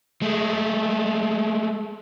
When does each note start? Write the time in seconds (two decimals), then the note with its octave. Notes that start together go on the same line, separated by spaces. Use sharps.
0.22 G#3 A3